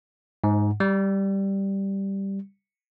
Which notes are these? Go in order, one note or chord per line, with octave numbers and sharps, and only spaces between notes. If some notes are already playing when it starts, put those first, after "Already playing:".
G#2
G3